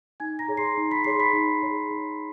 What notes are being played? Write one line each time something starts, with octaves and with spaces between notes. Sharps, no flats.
D#4 G#5 G#6
A#5 A#6
G#4 C#5
C6 C7
D#4
B5 B6
G#4 C#5 C6 C7
B5 B6
D#4
G#4 C#5
D#4